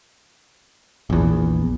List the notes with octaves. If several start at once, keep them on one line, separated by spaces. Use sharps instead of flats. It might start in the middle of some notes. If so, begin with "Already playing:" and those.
A#1 E2